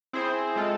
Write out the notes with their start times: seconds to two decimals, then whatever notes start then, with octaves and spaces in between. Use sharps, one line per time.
0.13 C4 E4 G#4 C5
0.56 G#3 C4 F4 A4